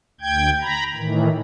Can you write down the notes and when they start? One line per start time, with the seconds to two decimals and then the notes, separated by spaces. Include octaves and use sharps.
0.21 D2 G5 G6 G#6
0.61 A#5 B5
0.95 A2 D#3 E3